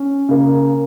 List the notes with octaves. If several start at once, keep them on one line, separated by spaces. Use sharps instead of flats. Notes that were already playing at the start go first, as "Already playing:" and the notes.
Already playing: C#4
C#3 A#3